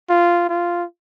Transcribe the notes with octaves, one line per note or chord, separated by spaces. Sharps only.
F4
F4